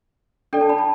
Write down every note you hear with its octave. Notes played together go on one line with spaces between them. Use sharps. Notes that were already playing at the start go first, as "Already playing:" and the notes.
D4 A4 D5 G5
A5
B5
A5